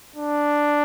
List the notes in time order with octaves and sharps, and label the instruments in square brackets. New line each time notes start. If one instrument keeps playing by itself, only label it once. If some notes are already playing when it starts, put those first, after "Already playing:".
[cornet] D4